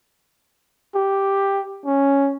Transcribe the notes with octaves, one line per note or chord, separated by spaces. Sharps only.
G4
C#4